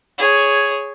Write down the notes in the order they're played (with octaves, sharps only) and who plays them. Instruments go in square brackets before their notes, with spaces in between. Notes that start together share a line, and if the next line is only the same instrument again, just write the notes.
[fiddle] G#4 C#5